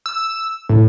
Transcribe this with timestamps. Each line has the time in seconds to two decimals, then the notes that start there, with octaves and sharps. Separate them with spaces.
0.06 E6
0.69 A2